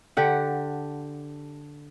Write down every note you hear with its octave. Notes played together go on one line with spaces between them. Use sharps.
D3 G4 F#5